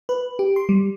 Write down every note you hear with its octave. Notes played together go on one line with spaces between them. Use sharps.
B4
G4
C6
G3